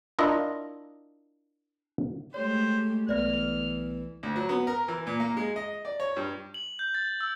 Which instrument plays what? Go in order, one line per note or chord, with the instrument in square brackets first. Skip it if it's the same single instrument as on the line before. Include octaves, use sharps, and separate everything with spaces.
[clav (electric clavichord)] D4 E4 F4 A#4 D#5
[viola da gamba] G#3 A3 G4 [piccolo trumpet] C5 [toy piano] C#5
[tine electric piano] B1 B3 B4 [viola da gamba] E3 [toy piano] D5 E5 [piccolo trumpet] F6
[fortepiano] D2
F#3
B3
A#4
E3
A#2
A#3
G#3
D#5
D5
C#5
G2
[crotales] F#7
G6
A6
E6